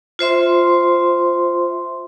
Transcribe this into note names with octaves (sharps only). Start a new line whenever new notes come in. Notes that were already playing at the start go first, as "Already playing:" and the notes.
F4 C5 E5 C6